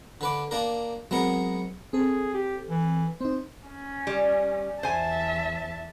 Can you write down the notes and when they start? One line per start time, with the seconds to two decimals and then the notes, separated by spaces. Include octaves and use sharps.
0.21 D3 B4 D6
0.51 A#3 D4 A#4
1.11 F#3 G#3 B3 C4 A#4 C#7
1.93 C4 G#4 A4
2.34 G4
2.68 E3
3.21 C4 D#4 C5
3.68 C#4
4.07 G3
4.83 E2 C5 E5 G#5 A5